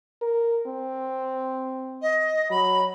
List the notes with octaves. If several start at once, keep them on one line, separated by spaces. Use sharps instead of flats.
A#4
C4
D#5
F#3 B5